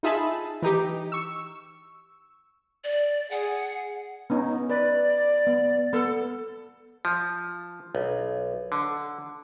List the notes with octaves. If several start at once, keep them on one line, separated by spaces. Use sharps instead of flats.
D#4 F4 G#4 E5 A5 B5
E3 D#4 G4
C#6 E6
D5
G#4 F#5
B3 C#4 D#4
B4 D5
B3
B3 A4
F3
B1
D3